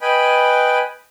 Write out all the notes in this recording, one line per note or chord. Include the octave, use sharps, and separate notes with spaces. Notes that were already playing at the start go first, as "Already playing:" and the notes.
B4 D#5 G5 G#5 B5